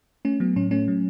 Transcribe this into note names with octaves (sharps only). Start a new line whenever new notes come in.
A3 C#4
F#3 B3
A2 C#4
A3 C#4
F#3